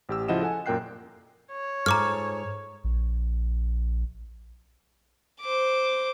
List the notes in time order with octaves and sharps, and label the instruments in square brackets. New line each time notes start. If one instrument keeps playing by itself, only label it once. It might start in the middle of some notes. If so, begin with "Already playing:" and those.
[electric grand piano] A1 G4 E6
C#3 F3 E4 D#5 F#5 E7
A4 F#5 G#5
F#2 A#2 A#4 G5 F#6 C7
[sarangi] C#5
[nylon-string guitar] G#2 F4 A4 [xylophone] A#5 D6 F6
[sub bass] A#1
[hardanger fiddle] C5 D6